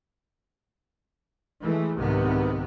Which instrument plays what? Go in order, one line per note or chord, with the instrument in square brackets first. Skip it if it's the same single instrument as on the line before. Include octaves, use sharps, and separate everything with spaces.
[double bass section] E3 G#3 A3
C2 G#2 C3 D#3 B3